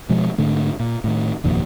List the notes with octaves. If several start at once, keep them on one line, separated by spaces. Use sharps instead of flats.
B2 F3 G#3
G#2 D3 A3
A#2
A2 D#3
F1 D#2 A#2 F3